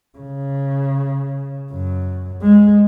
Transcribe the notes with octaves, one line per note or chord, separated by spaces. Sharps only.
C#3
F#2
G#3